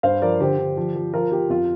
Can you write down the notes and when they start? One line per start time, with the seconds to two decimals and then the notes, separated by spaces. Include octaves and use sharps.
0.03 G2 C5 F5
0.22 F3 A#4 D5
0.40 D3 G4 C5
0.58 D3
0.77 F3
0.95 F3
1.13 F3 F4 A#4
1.31 F3 G4
1.49 F2 F4